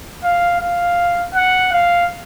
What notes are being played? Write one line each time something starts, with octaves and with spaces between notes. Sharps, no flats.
F5
F5
F#5
F5